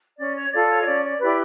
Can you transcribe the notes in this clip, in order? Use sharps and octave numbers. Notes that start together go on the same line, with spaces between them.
C#4 D5
C#5
F4 A4 D5
C#5
D#5
C#4 D5
D5
E4 G4 B4 D5